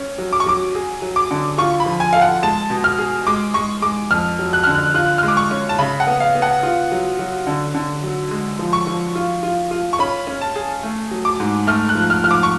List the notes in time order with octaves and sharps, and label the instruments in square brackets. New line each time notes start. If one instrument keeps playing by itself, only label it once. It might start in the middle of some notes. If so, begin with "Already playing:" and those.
Already playing: [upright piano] C#4
F#3
[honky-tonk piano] D6
C#6
[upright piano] F#3 [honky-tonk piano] D6
[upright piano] G#4
F#3
[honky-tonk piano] D6
[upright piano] D3
[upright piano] F4 [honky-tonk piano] C#6
[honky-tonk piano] B5
[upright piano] F3
[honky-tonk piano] G#5
[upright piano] A4 [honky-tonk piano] F5
[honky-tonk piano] F#5
[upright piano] G#3 [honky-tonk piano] A5
[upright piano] B2
[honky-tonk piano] F6
[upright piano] G#4
[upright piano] G#3 [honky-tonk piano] D6
[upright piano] G#3 [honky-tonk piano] C#6
[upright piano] G#3 [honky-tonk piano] D6
[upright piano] F2 [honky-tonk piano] F6
[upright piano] F#3
[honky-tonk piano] F#6
[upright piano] D3 [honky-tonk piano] F6
[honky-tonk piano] F#6
[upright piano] F4 [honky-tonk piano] F#6
[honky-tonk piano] F6
[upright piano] G#3 [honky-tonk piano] D6
[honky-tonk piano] C#6
[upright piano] C#4
[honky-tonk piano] A5
[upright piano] C#3 [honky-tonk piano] B5
[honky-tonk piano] F#5
[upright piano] B3
[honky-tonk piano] F5
[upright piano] B3
[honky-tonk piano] F#5
[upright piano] F4
F#3
F#3
D3
D3
F#3
G#3
F3
[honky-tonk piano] C#6
[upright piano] F3
F4
F4
F4
[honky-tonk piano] C#6
[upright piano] C#4 [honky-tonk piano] B5
[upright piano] C#4
[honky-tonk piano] A5
[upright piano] G#4
A3
F#3
[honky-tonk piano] D6
[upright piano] G#2
[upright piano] A3 [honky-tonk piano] F6
[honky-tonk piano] F#6
[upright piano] F3
[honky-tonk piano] F6
[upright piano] F3 [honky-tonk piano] F6
[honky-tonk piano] D6
C#6